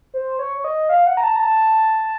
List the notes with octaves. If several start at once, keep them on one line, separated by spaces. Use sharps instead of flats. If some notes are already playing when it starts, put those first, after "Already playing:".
C5
C#5
C#5
D#5
F5
F#5
A#5
A5
A#5
A5